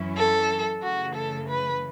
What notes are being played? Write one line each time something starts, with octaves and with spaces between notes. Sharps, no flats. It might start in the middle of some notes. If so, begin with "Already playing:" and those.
Already playing: F#2 E3 C#4 E4
A4
F#2 C#3 E3 A3 F#4
A4
B4